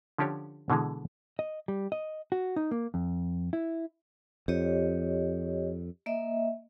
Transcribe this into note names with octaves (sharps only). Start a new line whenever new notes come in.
D3 F3 C#4 D4 G4 C#5
B2 D3 E3 G#3
D#5
G3
D#5
F#4
D#4
A#3
F2
E4
F2 G4 C#5 D#5
A#3 D#5 E5